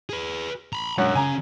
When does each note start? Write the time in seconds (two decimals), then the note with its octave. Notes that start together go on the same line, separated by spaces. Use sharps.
0.09 G#4 B4
0.73 A#5 B5
0.98 F#2 G#3 C#4 D4 F#5
1.15 C#3 C#4 G#5 A#5